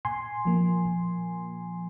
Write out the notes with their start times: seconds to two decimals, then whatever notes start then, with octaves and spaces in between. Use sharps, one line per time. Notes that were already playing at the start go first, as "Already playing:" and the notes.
0.05 A#2 G#5 C6
0.45 F3 A#3
0.86 A#2